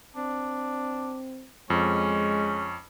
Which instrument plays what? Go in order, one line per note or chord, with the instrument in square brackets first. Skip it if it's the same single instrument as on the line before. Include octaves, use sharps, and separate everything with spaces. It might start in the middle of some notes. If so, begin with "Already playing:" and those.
[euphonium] C4 [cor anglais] D4
[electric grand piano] F2 [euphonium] G#3 [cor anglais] C#4